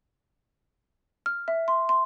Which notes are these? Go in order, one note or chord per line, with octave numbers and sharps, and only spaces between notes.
F6
E5
C6
C6